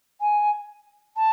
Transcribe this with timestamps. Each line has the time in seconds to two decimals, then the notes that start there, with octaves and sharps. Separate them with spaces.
0.21 G#5
1.16 A5